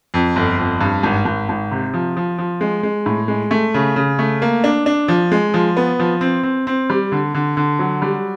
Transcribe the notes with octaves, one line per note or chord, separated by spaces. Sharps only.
F2
G1
F2
G2
G#1
G#1
G#1
C3
F3
F3
F3
G#3
G#3
A2
G#3
A3
C#3
C#3
A3
A#3
D4
D4
F3
G#3
F3
B3
F3
C4
C4
C4
G3
D3
D3
D3
F#3
G3